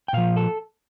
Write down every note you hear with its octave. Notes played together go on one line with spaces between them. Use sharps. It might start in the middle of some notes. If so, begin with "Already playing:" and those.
G5
A#2 F3 F5
A4